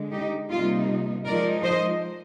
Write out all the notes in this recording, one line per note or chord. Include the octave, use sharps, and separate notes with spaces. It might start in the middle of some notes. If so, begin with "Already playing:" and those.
Already playing: D3 G#3
D#4 G4
C3 G3 A#3 D#4 F4
F3 G#3 D#4 A#4 D5
C5 D#5